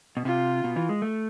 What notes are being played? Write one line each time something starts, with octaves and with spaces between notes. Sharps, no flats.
B2
C3 F4
B2
E3
G#3
A3